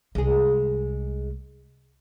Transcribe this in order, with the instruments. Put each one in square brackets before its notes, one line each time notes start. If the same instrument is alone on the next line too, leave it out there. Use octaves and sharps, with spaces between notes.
[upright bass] C2 [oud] G#3 G#4